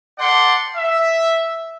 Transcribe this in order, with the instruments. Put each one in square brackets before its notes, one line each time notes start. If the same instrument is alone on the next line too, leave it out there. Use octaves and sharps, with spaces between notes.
[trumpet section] A4 D5 F#5 G5 C6
E5